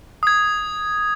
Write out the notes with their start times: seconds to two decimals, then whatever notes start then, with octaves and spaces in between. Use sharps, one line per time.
0.23 D#6 G#6